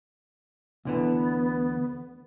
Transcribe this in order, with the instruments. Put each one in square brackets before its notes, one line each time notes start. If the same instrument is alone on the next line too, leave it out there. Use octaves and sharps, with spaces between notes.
[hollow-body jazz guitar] D2 D3 E3 [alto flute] B3